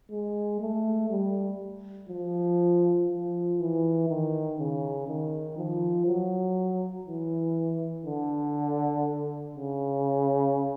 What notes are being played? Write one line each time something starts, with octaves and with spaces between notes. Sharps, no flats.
G#3
A3
G3
F3
F3
E3
D#3
C#3
D#3
F3
F#3
E3
D3
C#3